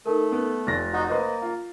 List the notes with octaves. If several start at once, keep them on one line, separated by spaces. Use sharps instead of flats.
A3 D#4 A4 A#4
B3
F1 A6 A#6
D#4 F#4
A#3 B4 C5 D#5
F4